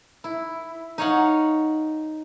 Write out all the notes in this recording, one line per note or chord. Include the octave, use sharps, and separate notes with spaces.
E4
D#4 C#5 F5 F#5